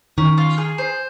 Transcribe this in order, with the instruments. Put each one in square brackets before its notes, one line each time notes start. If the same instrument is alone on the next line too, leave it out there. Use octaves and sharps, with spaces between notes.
[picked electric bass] D#3 [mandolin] C#4
[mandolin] F4
G#4
C5